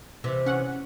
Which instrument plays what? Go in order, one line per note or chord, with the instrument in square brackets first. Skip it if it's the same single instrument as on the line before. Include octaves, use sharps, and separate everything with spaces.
[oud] C3 E3
[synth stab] C#4 F#5